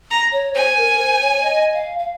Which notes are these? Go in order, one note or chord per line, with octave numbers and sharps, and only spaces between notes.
A#5
C#5
C5 G#5
A#4
C5
C#5
D#5
F5
F5